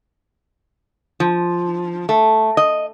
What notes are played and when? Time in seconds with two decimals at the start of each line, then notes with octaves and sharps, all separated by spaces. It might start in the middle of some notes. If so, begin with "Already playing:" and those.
1.20 F3
2.09 A3
2.57 D#5